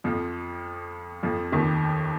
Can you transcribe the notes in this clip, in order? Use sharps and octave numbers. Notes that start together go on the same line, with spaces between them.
F2 F3
F2 F3
D#2 D#3